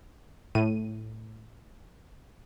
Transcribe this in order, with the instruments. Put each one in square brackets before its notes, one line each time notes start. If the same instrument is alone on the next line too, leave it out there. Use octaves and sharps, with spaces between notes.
[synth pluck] A2 D#7